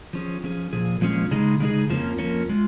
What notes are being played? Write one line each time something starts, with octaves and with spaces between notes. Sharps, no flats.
F3 C#4 G#4
F3 C#4 G#4
A#2 F3 G#4
A#2 F3 G#3 C#4 G#4
C#3 G#3 D#4 G#4
C#3 G#3 D#4 G#4
F2 F3 A#3 C#4
F2 F3 A#3 C#4
G#3 F4